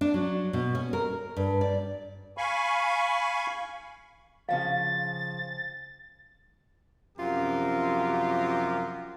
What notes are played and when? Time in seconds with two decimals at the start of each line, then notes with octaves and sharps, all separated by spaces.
0.01 D4
0.14 F#3
0.53 B2
0.75 C#4
0.93 A#4
1.37 G2
1.61 D5
2.38 F5 G#5 B5 C#6
4.49 C#3 F3 F5 G5 A6
7.18 F#2 C3 F3 F4 G4 A#4